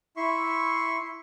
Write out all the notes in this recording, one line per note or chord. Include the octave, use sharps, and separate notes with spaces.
E4 E5 C6 C#6